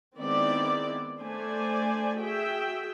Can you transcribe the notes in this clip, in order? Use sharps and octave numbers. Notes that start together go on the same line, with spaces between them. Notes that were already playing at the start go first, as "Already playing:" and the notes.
D#3 G#3 B3 C4 E4 D5
A3 D4 C5 D5 G#5
F#4 G#4 E5 G5